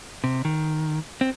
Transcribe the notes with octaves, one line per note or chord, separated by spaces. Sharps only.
C3
D#3
C4